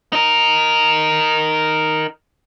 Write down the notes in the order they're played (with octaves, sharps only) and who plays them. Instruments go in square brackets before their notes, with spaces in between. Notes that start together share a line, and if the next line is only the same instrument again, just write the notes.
[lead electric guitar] D#4 A#4